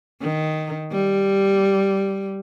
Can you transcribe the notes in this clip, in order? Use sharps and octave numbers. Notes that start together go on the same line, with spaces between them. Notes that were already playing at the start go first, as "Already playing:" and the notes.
D#3
G3